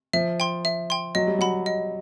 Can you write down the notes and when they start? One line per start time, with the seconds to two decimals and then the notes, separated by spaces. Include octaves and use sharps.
0.13 F3 E5
0.40 G5 C6
0.65 E5
0.90 G5 C6
1.15 F#3 D#5
1.27 G3
1.38 F#3 F#5 B5
1.66 D#5